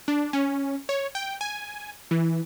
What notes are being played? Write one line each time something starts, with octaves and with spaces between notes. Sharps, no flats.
D4
C#4
C#5
G5
G#5
E3